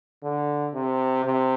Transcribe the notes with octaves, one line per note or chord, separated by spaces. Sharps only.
D3
C3
C3